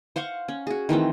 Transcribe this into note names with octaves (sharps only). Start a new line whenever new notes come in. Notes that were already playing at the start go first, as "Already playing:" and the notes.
C5 F5 F#5 C#6
C#4
F#4 G#4
D#3 E3 A3 C4